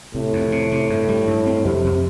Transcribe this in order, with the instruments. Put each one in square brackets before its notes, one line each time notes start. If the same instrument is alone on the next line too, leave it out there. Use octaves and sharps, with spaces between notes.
[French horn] A2 [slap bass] C3
[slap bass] F2
C3
C3
G2
G3
G2
C4
[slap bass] F2 [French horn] C3
[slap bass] F2